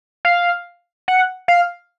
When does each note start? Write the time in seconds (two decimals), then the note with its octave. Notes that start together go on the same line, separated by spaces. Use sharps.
0.25 F5
1.08 F#5
1.48 F5